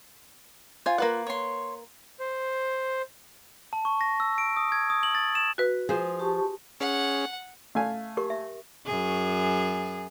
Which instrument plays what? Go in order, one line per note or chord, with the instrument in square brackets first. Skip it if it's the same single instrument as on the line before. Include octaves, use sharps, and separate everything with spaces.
[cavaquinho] F4 [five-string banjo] C5 G#5
[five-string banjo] A#3 B4 F#5
[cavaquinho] C#5 C6
[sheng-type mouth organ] C5
[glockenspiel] A5
C#6
A#6
E6
D7
D#6
G#6
D#6
F#7
A6
E7
[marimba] F#4 B4
[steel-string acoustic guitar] F3 [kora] G#4 C5
[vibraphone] G4 A5 C#6
[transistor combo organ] C#4 G#4 [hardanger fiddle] F#5
[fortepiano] A3 F5 G#5
[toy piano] G4 A#4 C#6
E5
[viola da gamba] F#2 G#4